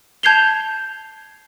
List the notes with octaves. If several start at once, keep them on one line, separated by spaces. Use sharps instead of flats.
A5 G6 G#6 C7 F7 G7